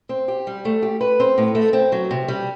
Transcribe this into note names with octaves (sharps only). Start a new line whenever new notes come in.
C4
G4
G3
A3
G4
B4
C4
A2
A3
C4
F#3
C3
G3